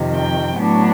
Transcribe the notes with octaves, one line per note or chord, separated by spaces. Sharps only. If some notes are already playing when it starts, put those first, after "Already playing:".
Already playing: F2 C3 D#3
G5
A2 F#3 B3 D4